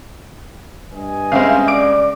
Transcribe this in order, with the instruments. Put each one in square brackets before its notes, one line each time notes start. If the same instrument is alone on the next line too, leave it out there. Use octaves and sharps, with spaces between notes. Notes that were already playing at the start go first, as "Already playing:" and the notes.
[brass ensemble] G2 D#5 G#5
[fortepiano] C#3 G#3 [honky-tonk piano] C4 E5 F5
[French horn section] D5 [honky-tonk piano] D6 D7